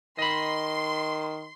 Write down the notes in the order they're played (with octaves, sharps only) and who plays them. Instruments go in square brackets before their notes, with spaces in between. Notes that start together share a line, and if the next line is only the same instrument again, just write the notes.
[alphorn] D#3 [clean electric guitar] D#5 B5 [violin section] C6